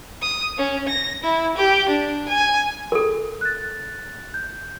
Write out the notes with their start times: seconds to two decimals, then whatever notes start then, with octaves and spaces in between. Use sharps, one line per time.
0.22 D#6
0.58 C#4
0.88 A#6
1.24 E4
1.57 G4
1.89 D4
2.28 G#5
2.92 A4 A#4
3.41 F#6 A6
4.34 G6